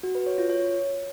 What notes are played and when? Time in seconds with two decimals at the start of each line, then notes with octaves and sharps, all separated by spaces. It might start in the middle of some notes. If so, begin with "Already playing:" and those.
0.03 F#4
0.15 B4
0.27 C#5
0.38 F4
0.50 C#5